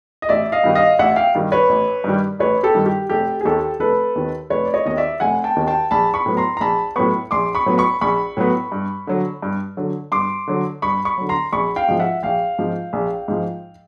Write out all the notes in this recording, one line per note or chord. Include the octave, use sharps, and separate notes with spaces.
D#5
A1 D5 E5
D#5 F5
G2 D#3 G3
D#5 F5
A1 E5 F#5
F5 G5
G2 D#3 G3
B4 C#5
A1
G2 D#3 G3
A1 B4 C#5
G4 A4
G2 D#3 G3
G4
F1 G4 A4
G#4
D#2 D#3 G4 A4
F1 A4 B4
D#2 D#3
F1 B4 C#5
D5
C#5 D#5
D#2 D#3 D#5
D5 E5
F1 F#5 G#5
G5 A5
D#2 D#3
G5 A5
A#1 A5 B5
B5 C#6
A2 F#3 B3
A#5 C6
A#5
A#1 A5 B5
A2 F#3 B3 B5 C#6
A#1 C6 D6
B5 C#6
A2 F#3 B3
B5 C#6
A#1 B5 C#6
A2 F#3 B3
G2
D3 F#3
G2
D3 F#3
G2 C6 D6
D3 F#3
G2 B5 C#6
B5 C#6
D3 F#3
A#5 C6
A#1 B5 C#6
F5 G5
G#2 F3
E5 F#5
A#1 F5 G5
G#2 F3
A#1
G#2 F3